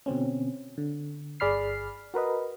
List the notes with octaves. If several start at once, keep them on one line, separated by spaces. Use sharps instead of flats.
B2 D3 C4 C#4
D3
G1 G#4 D5 B5 F6 C7
F#4 A#4 B4 D#5